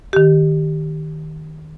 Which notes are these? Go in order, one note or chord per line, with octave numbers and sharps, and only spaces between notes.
D#3 G4